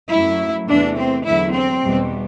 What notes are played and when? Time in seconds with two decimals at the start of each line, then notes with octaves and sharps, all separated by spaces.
0.11 F#2 F#3 A3 E4
0.68 E2 C3 E3 A3 D4
0.97 C4
1.24 E2 D3 F#3 E4
1.53 C4
1.82 E2 B2 G3